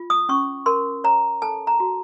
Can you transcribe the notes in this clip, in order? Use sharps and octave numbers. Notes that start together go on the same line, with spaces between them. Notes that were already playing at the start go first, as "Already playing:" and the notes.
Already playing: F4
D#6
C#4 C#6
A#4 C6
C#5 A#5
A4 A5
A#5
F#4